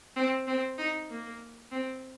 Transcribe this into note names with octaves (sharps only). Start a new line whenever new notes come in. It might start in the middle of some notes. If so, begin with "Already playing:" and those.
C4
C4
D#4
A#3
C4